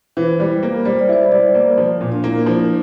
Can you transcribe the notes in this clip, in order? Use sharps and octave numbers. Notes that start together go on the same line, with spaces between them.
E3 C5
G3
A#3
G3 C5
D5
E4 C5
G3 D5
A#3
F3
A#2
D4
A#3 E4
F3